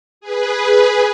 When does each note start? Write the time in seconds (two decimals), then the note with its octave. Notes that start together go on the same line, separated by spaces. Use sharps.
0.21 G#4 B4